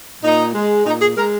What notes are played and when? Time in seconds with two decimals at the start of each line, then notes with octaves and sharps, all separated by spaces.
0.24 A#2 D#4
0.54 G#3
0.86 A#2 D#4
1.01 G#4
1.17 G#3 A#4